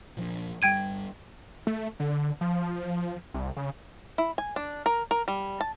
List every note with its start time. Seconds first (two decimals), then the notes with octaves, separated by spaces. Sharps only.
0.17 A#2 F3 D4
0.62 G1 G3 G5 G#6 D#7
1.67 A3
2.00 D3
2.41 F3
3.34 C2
3.57 C#3
4.18 E4
4.38 G#5
4.56 D4
4.86 A#4
5.11 A#4
5.28 G3
5.61 A5